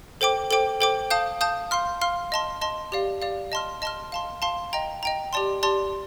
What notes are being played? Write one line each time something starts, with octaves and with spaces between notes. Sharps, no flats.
A4 C5 G5 D6
A4 C5 G5 D6
A4 C5 G5 D6
F5 A5 D#6 G6
F5 A5 D#6 G6
F5 C6 F6
F5 C6 F6
D#5 A5 C6
D#5 A5 C6
G4 D5 F5
G4 D5 F5
D#5 A5 C6 F6
D#5 A5 C6 F6
F5 A5 C6
F5 A5 C6
D#5 G5 A#5
D#5 G5 A#5
G4 D5 A5 C6
G4 D5 A5 C6